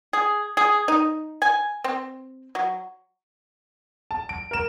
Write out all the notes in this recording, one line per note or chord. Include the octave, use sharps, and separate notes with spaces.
G#4
G#4
D#4
G#5
C4
F#3
A5
D7
A#4 E7